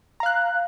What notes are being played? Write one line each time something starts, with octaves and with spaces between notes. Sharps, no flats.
F5 A#5 F#6